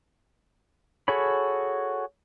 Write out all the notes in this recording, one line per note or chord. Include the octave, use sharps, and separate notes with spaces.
F#4 G#4 A4 C#5 B5